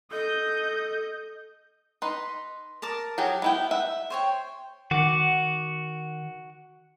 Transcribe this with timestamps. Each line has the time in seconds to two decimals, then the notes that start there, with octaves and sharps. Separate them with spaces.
0.11 A4 D#5 G6
2.02 D#4 B4 C6
2.82 A#4 A5 D6
3.18 F#3 G4 G#4
3.42 B3 E4 G5
3.71 E5 F#5
4.10 C5 C#5 G5
4.91 D#3 F#4 F#5 D6